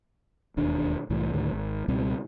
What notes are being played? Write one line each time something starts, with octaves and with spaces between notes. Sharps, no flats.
E1 D#2 D4
C2 A2 E3
D2 A2 D#3
G#1
C#2 B2 G3 C4